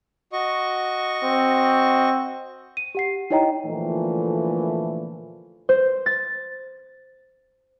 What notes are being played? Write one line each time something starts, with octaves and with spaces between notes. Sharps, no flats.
F#4 D#5 C#6
C4
D#7
G4 F#5 C7
D#4 E4 C#5 D#5 G5 A#5
A#2 D3 E3 F3 A3
C5
A6